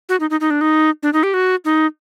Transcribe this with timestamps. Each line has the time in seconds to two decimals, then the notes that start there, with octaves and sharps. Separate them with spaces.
0.09 F#4
0.20 D#4
0.30 D#4
0.41 D#4
0.50 D4
0.61 D#4
1.03 D4
1.13 D#4
1.23 G4
1.34 F#4
1.65 D#4